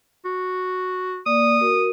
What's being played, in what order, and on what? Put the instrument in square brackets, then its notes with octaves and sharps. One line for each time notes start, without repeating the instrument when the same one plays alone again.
[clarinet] F#4
[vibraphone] A#3 D5 [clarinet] D#6
[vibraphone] F#4 A#4